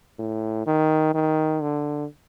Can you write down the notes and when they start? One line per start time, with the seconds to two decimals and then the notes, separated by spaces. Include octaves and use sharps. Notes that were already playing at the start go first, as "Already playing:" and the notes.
0.19 A2
0.67 D#3
1.14 D#3
1.62 D3